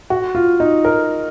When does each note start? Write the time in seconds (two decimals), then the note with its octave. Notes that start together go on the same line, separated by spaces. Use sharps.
0.10 F#4
0.35 F4
0.60 D#4
0.85 A#4